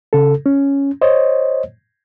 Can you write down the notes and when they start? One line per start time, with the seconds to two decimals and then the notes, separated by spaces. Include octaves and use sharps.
0.13 C#3 A4
0.46 C#4
1.02 C5 C#5 D#5